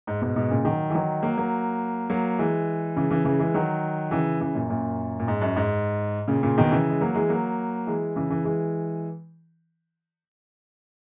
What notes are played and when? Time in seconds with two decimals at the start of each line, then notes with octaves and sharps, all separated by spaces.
0.07 G#2
0.21 G#2 B2
0.36 G#2 B2
0.50 A#2 C#3
0.65 D#3 F#3
0.90 E3
0.94 D#3 F#3
1.23 F#3 A#3
1.37 F#3 A#3
2.09 F#3 A#3
2.38 E3 G#3
2.96 C#3 E3
3.10 C#3 E3
3.25 C#3 E3
3.39 E3 G#3
3.54 D#3 F#3
4.11 C#3 E3
4.40 C#3 E3
4.54 F#2 A#2
4.69 F#2 A#2
5.19 A#2
5.28 G#2
5.41 F#2
5.56 G#2
6.28 A#2 C#3
6.43 A#2 C#3
6.58 B2 D#3
6.71 C#3 E3
6.89 G#3
7.01 F#3 A#3
7.14 E3 G#3
7.29 F#3 A#3
7.87 E3 G#3
8.16 C#3 E3
8.30 C#3 E3
8.44 E3 G#3